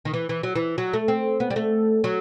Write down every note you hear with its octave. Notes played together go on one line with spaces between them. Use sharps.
D#3
E3
E3
F#3
E3
F#3
A3
C4
B3
G3
A3
F#3